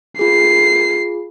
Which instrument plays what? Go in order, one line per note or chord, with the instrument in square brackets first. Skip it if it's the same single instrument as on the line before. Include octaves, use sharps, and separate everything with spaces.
[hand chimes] F4 G#4 [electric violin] C7